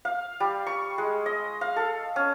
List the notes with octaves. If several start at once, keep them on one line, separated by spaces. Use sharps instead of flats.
F5
G3
C#6
G#3
D#5
F5
A4
C#4